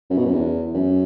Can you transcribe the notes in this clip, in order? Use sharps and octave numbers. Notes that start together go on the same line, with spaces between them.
F#2
B2
F#2
E2
F#2